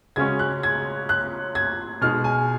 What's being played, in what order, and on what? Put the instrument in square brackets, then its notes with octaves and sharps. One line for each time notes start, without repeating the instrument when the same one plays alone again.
[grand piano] C#3 G#3 C#4 F#4 [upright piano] G#6
[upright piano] F#6
G#6
F#6
G#6
[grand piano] B2 G#3 D#4 G#4 [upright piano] F6
[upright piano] G#5